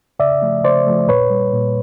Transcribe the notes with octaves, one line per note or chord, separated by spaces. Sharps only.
C#3 D5 E5
F3 A3
C#3 C5 D5
F3 A3
A#2 B4 C#5
G3
A#2